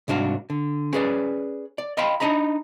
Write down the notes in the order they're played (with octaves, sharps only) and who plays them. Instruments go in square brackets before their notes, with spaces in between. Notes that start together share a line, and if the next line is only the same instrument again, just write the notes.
[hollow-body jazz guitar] C2 G#2 D4 F#4 F5
D3
C#4 G#4 B4 D5
D5
D#5 F5 G5 B5 C6
D4 D#4 D#5 A#5 B5